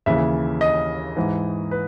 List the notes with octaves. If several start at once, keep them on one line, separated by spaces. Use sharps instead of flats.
D#2 C#3 E3 E5
D#5
G#2 E3
B4